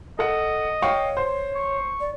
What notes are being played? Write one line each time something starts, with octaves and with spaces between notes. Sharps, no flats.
A4 D#5 F#5
C#5 F5 G5 C#6
C5
C#6
D5